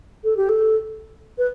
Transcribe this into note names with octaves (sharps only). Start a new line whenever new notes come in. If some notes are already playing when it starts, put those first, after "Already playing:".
A4
G4
A4
B4